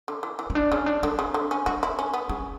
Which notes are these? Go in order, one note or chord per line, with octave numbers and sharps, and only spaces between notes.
D3
E3
E3
C#4
D4
C#3 C#4
D4
D3 D4
C#3
D3
C#4
D4 F#4
E4
C#4
B3
C#3 E4